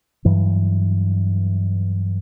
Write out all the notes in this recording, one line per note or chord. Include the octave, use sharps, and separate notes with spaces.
G2 E3 F#3